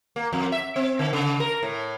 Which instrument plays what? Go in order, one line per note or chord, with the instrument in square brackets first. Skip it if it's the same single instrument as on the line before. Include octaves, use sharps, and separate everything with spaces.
[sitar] A#3
F2
E5
C4
D3
C#3
A#4
A2